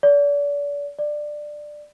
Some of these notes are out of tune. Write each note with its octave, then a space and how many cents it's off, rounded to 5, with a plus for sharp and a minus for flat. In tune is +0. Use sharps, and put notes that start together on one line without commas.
D5 -35
D5 +15